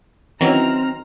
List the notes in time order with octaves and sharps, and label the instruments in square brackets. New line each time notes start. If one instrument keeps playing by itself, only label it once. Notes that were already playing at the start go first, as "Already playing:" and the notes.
[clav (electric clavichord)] D#3 F#3 [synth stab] E3 C#4 E4 [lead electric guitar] C4 [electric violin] A#5 F6